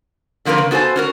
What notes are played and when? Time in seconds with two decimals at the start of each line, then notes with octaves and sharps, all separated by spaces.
0.45 D3 F3 A#3 C4 A#4 B4
0.58 C#3
0.71 B3 F#4 A4 C5 G#5
0.96 C#4 F#4 A#4